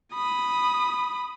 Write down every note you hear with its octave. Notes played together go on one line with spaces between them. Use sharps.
B5 D#6